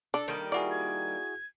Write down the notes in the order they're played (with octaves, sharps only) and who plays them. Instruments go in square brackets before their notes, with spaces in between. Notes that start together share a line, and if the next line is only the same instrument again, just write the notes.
[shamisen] D4 [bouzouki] A4
[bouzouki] D#3 G3 A#3
[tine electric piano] E4 F#4 G#4 [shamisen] D5
[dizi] G#6